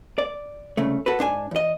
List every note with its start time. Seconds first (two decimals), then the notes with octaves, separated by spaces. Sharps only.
0.18 D5
0.77 C2 C#3 A3
1.06 F#4 A4 B4
1.19 G#2 D4 C#5 G#5
1.51 E2 D#5